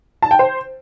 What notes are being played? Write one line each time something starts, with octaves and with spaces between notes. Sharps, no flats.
A5
G5
C5